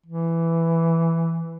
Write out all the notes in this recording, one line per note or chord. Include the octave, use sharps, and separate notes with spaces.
E3